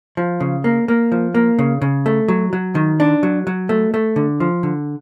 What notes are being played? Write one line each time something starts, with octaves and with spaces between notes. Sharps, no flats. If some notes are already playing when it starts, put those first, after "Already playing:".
F3
C#3
A#3
A#3
F3
A#3
C#3
C#3
A3
F#3
F#3
D#3
D4
F#3
F#3
A3
A3
D3
F3
D3